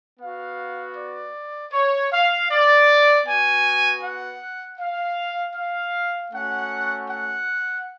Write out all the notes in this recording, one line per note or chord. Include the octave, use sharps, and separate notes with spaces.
B3 F#4 F5
D5
C#5
F5
D5
B3 F#4 G#5
F#5
F5
F5
A3 C#4 F#4 F#5
F#5